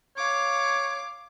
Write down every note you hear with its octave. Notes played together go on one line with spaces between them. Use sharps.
C#5 F5 D6